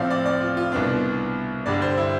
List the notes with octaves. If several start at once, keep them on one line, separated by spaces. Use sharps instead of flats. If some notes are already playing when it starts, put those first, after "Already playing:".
Already playing: A2 F3 A3 C4 D5 F5
D5
D5
F4
F4
C2 B2 B3 D4
G2 D3 G3 D4 D5
C5
E4